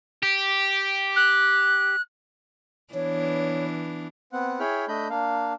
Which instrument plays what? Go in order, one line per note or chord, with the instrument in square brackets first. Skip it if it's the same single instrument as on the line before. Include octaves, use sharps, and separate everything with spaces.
[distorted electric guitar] G4
[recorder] F#6
[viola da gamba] E3 B3 D4 [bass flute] C#5
[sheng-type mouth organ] B3 C4 F#5
E4 G#4 C#5 G5 B5 F6
A3 D4 D#5 B5 G6
A#3 D4 F5